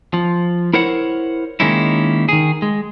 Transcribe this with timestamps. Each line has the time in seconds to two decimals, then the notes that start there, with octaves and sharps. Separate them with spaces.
0.14 F3
0.74 E4 A#4 C5 C#5 F#5
1.60 D#3 G#3 A#3 C#4 D#4 E4
2.29 D#3 G#4
2.62 G#3